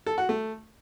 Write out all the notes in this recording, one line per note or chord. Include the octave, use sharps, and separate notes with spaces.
A4
F#4
A3